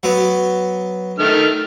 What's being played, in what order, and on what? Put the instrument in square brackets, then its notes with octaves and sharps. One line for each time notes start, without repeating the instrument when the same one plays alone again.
[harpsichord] F#3 B3
[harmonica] D#3 A3 F6